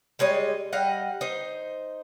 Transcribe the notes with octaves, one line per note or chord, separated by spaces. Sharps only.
G3 G#3 C#5 D#5
G3 D#5 F5 F#5
D#4 C5